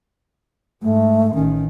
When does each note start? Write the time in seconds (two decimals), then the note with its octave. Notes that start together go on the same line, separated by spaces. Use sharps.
0.83 G#2 A3
1.34 A1 D#3 C#4